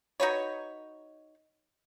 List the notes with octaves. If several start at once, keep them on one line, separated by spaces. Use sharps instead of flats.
D#4 F#4 B4 C#5